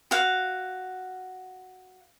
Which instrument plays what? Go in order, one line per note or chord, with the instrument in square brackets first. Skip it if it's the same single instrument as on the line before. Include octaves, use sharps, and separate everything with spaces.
[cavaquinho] F#4 F5